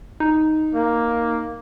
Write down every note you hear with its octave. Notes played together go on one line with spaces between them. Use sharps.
D#4
A#3